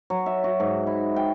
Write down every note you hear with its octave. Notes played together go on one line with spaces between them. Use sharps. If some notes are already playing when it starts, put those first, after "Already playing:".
F#3
E5
F#4
G#2
E4
G5